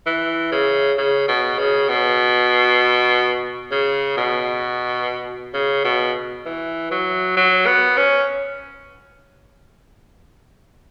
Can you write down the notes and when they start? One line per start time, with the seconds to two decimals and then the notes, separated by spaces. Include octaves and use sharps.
0.06 E3
0.52 C#3
0.98 C#3
1.28 B2
1.59 C#3
1.89 B2
3.71 C#3
4.17 B2
5.54 C#3
5.84 B2
6.46 E3
6.91 F#3
7.37 F#3
7.67 B3
7.97 C#4